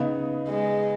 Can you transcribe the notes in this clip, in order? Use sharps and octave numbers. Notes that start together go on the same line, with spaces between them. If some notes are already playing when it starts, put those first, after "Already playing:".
Already playing: C#3 B3 D#4
G#3